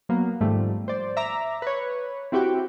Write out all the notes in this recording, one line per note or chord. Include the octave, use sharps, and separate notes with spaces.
F#3 A#3 B3
G#2 D#3 F3 G3 A3
C5 D5
E5 A#5 D6
B4 C#5
C4 E4 F#4 G4 G5